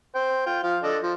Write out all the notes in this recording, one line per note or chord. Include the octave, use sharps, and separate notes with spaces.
C5 G5
F4 G5
F3 F5
D4 A4 D#5
F3